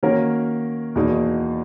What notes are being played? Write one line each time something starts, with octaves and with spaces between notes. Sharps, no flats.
D#3 A#3 C#4 F#4 A#4
E2 B2 A#3 D#4